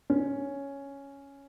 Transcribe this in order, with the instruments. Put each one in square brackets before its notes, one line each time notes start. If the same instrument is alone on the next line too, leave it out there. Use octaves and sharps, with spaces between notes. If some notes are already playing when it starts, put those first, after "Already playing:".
[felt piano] C#4